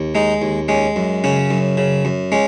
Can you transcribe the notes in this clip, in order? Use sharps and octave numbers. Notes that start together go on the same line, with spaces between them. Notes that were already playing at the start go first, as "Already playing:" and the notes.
Already playing: D#2
G#3 D#4
D#2
G#3 C#4
F#2
C#3 C#4
F#2
C#3
F#2
G#3 C#4